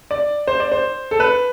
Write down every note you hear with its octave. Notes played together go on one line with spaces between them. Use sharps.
D5
C5
D5
C5
A4
B4